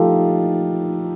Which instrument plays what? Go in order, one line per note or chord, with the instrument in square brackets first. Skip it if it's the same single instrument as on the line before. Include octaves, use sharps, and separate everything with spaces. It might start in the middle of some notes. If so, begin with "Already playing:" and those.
Already playing: [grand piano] F3 A3 D#4 F4 G4 A4